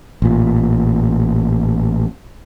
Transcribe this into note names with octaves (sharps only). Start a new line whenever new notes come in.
A1 A#2